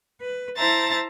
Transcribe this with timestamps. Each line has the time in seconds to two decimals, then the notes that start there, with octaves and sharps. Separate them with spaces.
0.22 B4
0.57 E4 C5 E5 A5 A#5 A6